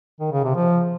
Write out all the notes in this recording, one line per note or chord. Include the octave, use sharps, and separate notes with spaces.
D#3
C#3
C3
F3